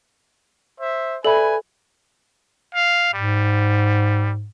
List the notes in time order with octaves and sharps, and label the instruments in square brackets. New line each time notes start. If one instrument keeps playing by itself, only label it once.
[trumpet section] C5 E5
[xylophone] A4 [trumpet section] B4 G#5 [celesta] D5 E5 B5
[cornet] F5
[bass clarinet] G#2 [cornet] G3